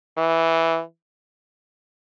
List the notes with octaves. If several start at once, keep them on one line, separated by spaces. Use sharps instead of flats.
E3